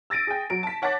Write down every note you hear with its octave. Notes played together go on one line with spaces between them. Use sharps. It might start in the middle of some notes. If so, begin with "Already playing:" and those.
E6 A6 A#6 D7 D#7
G#4 G5
F#3 D7
A5 B6
C#5 F#5 A5 D6 A6 B6